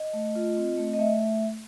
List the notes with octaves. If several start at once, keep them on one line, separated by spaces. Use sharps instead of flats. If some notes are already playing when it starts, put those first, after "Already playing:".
Already playing: D#5
A3
F4
C4
A3
D#5
A3 E5